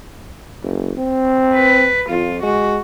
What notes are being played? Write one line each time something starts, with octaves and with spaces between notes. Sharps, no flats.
F#1
C4
B4
F2 F4
G#3 F#4